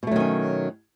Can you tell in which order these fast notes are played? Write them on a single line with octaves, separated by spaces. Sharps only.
B2 A3 F#3 D#3 C#4